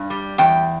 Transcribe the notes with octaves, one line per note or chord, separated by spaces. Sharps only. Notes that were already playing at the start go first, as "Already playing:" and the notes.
Already playing: G2
G3
E2 G5